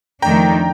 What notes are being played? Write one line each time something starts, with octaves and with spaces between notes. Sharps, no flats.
F2 D#3 A3 D4 G5 A#5